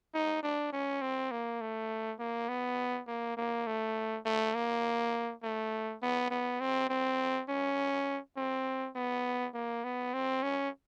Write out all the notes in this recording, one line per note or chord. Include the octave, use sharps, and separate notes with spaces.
D#4
D4
C#4
C4
A#3
A3
A#3
B3
A#3
A#3
A3
A3
A#3
A3
B3
B3
C4
C4
C#4
C4
B3
A#3
B3
C4
C#4